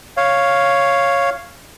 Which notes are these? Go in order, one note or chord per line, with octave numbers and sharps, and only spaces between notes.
C#5 F5